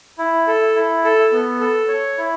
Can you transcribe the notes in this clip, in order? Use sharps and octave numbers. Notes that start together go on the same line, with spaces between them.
E4
A4
E4
A4
B3
A4
C#5
E4